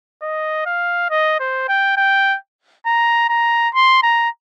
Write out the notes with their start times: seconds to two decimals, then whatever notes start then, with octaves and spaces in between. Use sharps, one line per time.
0.22 D#5
0.66 F5
1.10 D#5
1.40 C5
1.68 G5
1.97 G5
2.86 A#5
3.29 A#5
3.74 C6
4.03 A#5